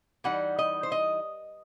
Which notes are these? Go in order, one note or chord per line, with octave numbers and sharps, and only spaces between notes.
E3 G3 D#4 F#5
D#5
C5
D#5